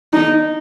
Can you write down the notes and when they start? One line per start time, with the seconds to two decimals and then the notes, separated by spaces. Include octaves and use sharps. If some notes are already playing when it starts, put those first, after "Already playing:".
0.13 D#4